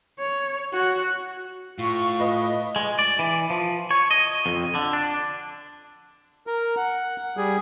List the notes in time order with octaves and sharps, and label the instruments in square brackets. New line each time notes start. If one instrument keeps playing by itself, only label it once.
[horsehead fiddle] C#5
F#4
[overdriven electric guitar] A2 [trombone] F4 [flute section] C#6
[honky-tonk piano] B4 D#5
[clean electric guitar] G#3
D5
E3
F3
C#5
D#5
F2
D3
D4
[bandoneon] A#4
F#5
G3 G#4